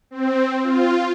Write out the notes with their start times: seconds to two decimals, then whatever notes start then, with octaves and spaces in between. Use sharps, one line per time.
0.11 C4
0.64 F4